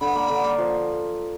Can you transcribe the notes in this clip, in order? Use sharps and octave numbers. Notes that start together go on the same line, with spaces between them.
D3 B5
A#3
D3
A#3
F3